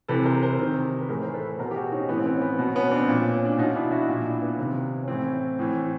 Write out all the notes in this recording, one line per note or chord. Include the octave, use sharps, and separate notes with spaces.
C3 E3 A4 B4
A#4 C5
A#4 C5
C3 D#3
B4
A2 E3 G#4 A#4
C5
A4 B4
B2 A#4 C5
G4
F#4 G#4
C#4 D#4
A2 E3 B3
C4
B3 C#4
B3
B2
B3 C#4
C4 D4
A#2
C#4
D4
B2 C#4 D#4
D4 E4
E4 F#4
A#2
D4 E4
B3
C3 D#3
C#4
A2 E3 C4
A2 E3